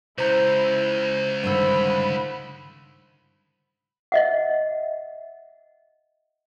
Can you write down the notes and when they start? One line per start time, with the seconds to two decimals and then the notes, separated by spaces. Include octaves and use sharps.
0.18 C#2 E4 C5 A#5 G6
1.43 G2 D3 D#3 C5 F#5 B5 E6
4.12 D#5 E5 F#5